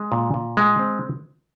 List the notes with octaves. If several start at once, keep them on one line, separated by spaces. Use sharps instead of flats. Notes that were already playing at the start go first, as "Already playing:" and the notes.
Already playing: G#3
A#2
A#2
G#3
C4